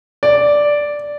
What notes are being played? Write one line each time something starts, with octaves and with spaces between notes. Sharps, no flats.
D5